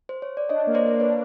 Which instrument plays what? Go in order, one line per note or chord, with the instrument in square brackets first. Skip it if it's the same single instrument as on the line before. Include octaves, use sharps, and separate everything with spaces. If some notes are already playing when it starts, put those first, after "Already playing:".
[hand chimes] C5
C#5
D5
[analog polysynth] D4 [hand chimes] C#5 D#5
[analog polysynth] A#3
[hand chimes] C5 D5
[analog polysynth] A#3
[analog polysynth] D4 [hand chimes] B4 C#5